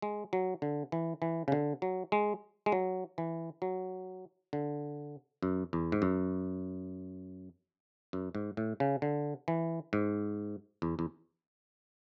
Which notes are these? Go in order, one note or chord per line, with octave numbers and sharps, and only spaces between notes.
G#3
F#3
D3
E3
E3
C#3
D3
F#3
G#3
G#3
F#3
E3
F#3
D3
F#2
E2
G#2
F#2
F#2
G#2
A2
C#3
D3
E3
G#2
E2
E2